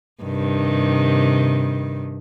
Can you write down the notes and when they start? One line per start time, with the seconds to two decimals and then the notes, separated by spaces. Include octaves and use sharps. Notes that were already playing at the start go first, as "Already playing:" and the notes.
0.23 G2 C3 D#3